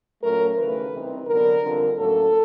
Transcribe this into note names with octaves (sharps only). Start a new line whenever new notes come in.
A#2 F#3 A3 C#4 A#4
D#2 C#3 E3 A3 B4
C3 E3 G3 C4 D#4
D3 F#3 B3 D4 A#4
F2 D3 G3 C4
A2 F#3 A#3 C#4 A4